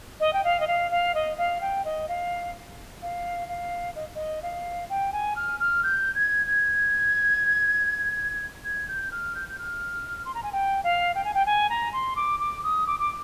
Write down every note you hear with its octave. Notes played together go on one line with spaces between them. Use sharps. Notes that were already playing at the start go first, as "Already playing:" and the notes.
D#5
G5
F5
D#5
F5
F5
D#5
F5
G5
D#5
F5
F5
F5
D#5
D#5
F5
G5
G#5
F6
F6
G6
G#6
G#6
G#6
G6
F6
G6
G6
F6
C6
A#5
G#5
G5
F5
G5
G#5
G5
G#5
A#5
C6
D6
D6
D#6
D6
D6